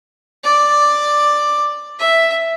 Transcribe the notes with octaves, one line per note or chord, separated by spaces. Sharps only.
D5
E5